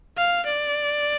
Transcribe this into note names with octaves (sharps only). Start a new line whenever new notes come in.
F5
D5